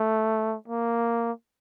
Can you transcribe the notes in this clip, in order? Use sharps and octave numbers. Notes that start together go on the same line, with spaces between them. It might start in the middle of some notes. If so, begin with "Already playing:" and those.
Already playing: A3
A#3